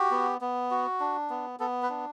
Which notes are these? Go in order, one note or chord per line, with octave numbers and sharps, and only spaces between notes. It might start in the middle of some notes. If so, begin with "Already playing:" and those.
Already playing: F#4 G4
B3
B3
F#4
D4
B3
B3 A4
B4
D4